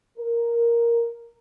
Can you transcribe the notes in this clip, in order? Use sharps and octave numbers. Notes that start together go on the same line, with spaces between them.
A#4